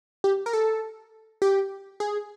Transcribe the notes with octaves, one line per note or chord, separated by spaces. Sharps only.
G4
A#4
A4
G4
G#4